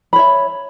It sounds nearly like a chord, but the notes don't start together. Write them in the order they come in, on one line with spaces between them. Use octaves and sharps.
B5 C#5 E5